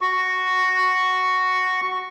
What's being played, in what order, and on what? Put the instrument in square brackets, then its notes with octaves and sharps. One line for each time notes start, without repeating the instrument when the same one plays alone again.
[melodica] F#4 C#6